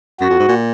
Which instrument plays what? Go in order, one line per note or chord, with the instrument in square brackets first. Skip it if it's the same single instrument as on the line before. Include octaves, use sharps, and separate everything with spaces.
[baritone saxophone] F#2 [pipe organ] F#4
[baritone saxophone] F2
G#2
A#2